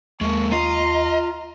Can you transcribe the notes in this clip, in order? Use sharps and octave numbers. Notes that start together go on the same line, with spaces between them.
D#2 G#3 A#3 C#6
F4 D#5 A#5